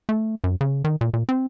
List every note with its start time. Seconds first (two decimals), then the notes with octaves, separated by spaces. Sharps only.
0.09 A3
0.44 F#2
0.61 C#3
0.84 D#3
1.01 A#2
1.14 A#2
1.29 C4